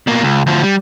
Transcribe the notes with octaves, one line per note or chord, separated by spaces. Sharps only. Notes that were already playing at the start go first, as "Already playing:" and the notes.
B2 A#3
C#2
D2 F3
G3